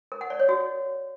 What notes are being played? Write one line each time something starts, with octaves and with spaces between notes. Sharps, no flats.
A#4
F#5
D5
C#5
F#4